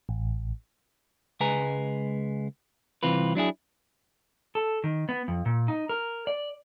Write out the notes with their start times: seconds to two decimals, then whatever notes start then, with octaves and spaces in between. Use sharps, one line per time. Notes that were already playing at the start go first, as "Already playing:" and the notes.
0.09 A1
1.40 C#2 G#3 B4 G#5 A#5
3.03 C2 E3 C4 F4 B4
3.35 F#3 D4 E4 G#4
4.55 A4
4.84 D#3
5.09 B3
5.28 F2
5.46 A#2
5.68 D#4
5.89 A#4
6.27 D5